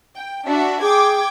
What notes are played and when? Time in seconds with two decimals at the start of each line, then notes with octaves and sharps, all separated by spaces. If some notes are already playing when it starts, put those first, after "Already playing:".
0.16 G5
0.46 D4 F#4 E5
0.82 G#4 G5 D6 G#6